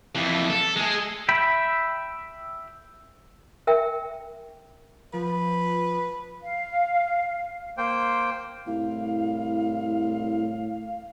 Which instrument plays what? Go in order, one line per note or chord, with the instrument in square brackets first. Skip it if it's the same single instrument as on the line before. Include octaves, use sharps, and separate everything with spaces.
[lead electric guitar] F2 E3
A4
G#3 G#4
[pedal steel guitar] E5 G5 B5
[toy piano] A#4 E5 G5
[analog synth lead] F3 [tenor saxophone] B4
[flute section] F5
[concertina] A#3 C5 G5
[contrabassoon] C2 [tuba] A2 [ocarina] F5